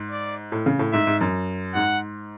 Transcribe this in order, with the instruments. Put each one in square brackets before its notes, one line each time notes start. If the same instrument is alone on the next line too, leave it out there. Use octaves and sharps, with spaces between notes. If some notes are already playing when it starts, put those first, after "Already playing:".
Already playing: [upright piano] G#2
[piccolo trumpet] D5
[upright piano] A2
C#3
A2
[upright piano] G#2 [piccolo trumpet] E5
[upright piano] G#2
F#2
[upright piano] G#2 [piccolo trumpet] F#5